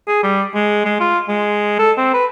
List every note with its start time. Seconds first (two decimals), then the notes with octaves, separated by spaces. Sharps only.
0.08 G#4
0.23 G3
0.55 G#3
0.85 G#3
1.00 F4
1.29 G#3
1.79 A4
1.98 C4
2.14 B4